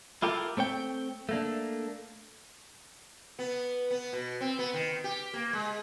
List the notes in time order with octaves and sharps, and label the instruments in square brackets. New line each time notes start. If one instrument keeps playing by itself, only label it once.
[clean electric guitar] E4 F4 G4 A4 A#4
A3 C4 C#5 G5
A3 A#3 D4
[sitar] B3
B3
B2
C4
B3
D#3
G4
A#3
G#3